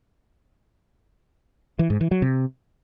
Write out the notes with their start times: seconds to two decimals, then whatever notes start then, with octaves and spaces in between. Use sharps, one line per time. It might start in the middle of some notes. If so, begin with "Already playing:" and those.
1.79 E3
1.90 G#2
2.01 E3
2.11 F#3
2.22 C3